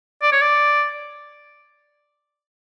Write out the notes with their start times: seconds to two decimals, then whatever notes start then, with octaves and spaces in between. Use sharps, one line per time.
0.22 D5
0.32 C#5
0.42 D5